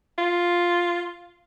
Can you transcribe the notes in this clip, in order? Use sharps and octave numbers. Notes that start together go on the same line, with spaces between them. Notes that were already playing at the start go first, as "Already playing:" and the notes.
F4